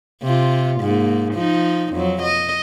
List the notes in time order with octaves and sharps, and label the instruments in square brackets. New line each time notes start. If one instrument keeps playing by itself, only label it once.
[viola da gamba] C3 F4
G#2 A#3
F3 D#4
F2 F#3
D#5